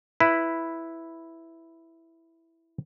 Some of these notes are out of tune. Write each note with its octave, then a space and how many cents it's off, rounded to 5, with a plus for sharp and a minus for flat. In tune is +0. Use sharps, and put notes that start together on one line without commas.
E4 +0 B4 +0